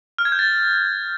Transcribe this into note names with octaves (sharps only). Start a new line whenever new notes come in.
F6
G#6
G6
A6